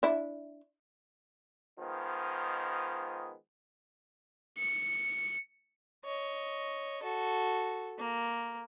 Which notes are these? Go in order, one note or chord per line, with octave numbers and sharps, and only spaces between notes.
D4 E4
D#3 F3 G#3 B3
C#7
C#5 D#5
F#4 A4
A#3